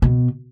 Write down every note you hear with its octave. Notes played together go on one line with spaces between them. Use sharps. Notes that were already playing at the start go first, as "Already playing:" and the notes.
B2